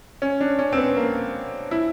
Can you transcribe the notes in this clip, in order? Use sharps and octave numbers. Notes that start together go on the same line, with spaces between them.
C#4
D4
C#4
C4
B3
A#3
E4